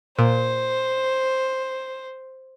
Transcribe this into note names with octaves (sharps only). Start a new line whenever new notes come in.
A#2 C5